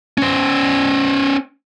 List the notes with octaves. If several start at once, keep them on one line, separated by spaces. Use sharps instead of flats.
C#4 C5